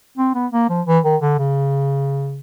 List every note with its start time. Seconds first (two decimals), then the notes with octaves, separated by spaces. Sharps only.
0.18 C4
0.34 B3
0.52 A#3
0.69 F3
0.87 E3
1.04 D#3
1.22 D3
1.38 C#3